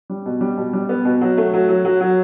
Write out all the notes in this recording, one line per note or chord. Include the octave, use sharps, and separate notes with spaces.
G3
B2
G3
B2
G3
B3
B2
F#3
A3
F#3
F#3
F#3
F#3